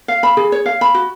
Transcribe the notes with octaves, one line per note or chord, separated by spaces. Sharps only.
F5
B5
G#4
C#5
F5
B5
F#4